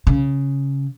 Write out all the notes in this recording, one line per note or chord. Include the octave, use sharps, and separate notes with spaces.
C#3